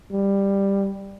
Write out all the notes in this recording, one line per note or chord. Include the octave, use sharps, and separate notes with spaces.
G3